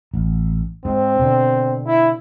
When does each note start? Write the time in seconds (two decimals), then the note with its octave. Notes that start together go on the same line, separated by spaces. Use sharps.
0.14 A1
0.85 G#2 C4
1.19 B2 D3
1.86 E4